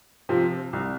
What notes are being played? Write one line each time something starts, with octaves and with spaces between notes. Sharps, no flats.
C3 F3
C2